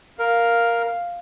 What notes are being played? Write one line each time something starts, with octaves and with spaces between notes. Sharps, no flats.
A#4 F5